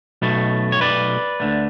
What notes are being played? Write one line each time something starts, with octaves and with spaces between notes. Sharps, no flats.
B1 B2 A3
C#5
B4 D5
D2 D3 A3